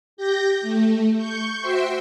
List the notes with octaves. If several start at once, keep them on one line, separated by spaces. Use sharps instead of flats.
G4 G6 A#6
A3
C#6 G6
F#4 C5 E5 G5 C6